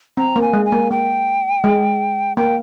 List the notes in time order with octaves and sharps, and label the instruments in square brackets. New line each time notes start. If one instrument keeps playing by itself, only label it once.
[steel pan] C4 [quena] A#5
[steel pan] A#3
[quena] G#5
[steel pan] G#3
[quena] G#5
[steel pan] A#3
[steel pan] A#3 [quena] G5
[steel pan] G#3
[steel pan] A#3 [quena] G5